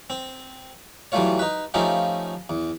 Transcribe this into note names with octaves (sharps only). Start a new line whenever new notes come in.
C4
E3 F#3 G3 A3 F4 C#5
D#4 B4
F3 A3 C#4 D#4 F4 G4
E2